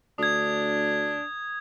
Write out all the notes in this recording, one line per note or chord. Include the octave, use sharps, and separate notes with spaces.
D2 D4 D#6 G#6